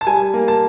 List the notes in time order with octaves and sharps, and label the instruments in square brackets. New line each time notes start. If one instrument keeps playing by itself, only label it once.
[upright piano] A5
G3 G#5
A#3
A5